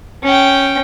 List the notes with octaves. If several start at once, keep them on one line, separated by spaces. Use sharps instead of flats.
C#4 G5